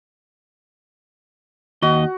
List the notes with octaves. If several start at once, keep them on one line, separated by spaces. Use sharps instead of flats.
D#2 F#4 D#5